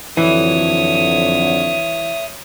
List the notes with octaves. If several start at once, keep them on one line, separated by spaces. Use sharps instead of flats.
F2 D3 E3 F#3 C#5 E5 D#6